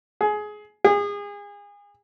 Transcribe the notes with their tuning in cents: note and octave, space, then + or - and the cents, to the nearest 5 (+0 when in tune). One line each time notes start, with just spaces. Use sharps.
G#4 +20
G#4 -30